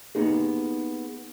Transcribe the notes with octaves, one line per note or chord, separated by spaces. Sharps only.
A#3 B3 D#4 G4 G#4